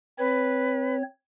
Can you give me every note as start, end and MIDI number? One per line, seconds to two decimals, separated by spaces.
0.18 1.02 60
0.18 0.96 71
0.18 1.02 73